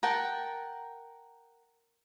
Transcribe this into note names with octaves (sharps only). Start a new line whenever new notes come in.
A#4 F#5 G5 A5